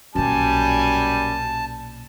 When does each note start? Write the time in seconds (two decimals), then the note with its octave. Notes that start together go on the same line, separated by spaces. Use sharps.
0.15 B1 F#2 A#2 G3 G#5 A5